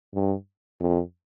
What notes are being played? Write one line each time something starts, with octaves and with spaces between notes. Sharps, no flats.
G2
F2